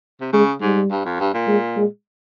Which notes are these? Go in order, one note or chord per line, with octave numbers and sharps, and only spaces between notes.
C3
C#3 G#3
G#2 G3
G2
F2
G2
A#2
G#3
G#3